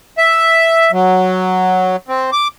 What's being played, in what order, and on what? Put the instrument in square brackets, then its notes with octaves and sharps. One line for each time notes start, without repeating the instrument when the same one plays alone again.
[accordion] E5
F#3
C4
D6